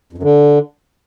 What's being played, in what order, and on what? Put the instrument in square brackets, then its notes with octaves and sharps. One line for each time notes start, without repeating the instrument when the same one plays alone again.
[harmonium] F2
F#2
D3